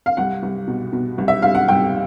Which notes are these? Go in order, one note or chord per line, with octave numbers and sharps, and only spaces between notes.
F5
C2 F#5
C2
B2
B2
C2
E5
C2 F5
F#5
C2 G5